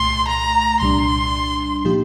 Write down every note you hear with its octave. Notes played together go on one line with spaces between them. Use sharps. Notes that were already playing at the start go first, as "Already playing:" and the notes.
Already playing: C2 A#2 A3 C6
A#5
C2 A#2 G3 D4 C6
A#2 F3 A#3 D#4 G4